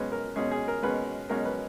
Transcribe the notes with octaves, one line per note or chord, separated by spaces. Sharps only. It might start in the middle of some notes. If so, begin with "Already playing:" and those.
Already playing: B2 G#3 C#4 B4
A#4
B2 G#3 C#4 G#4
G#4
A#4
B2 G#3 C#4 B4
B2 G#3 C#4 A#4
B4